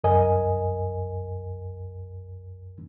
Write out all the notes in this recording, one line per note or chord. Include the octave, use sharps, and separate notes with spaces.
C2 F#2 A#4 D#5 G#5